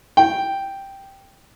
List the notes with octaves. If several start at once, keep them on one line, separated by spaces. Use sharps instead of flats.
G5